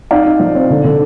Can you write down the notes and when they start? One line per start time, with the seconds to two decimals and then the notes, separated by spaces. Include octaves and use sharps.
0.11 D#4 D5 F5
0.26 D#4
0.39 F3
0.55 C4
0.70 D3
0.84 D3